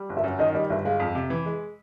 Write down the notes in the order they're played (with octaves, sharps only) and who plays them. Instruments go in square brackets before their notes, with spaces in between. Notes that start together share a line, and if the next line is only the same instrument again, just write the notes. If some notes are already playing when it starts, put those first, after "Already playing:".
Already playing: [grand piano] G3
G1
[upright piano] E5
[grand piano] F#2
[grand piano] D#3 [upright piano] D#5
[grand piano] G3 [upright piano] D#5
[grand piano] G1 [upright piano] E5
[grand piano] G#3 [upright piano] F5
[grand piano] F2
C3
E3
G#3